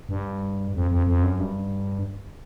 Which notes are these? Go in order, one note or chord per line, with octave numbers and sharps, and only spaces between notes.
G2
F2
F2
F2
F#2
G2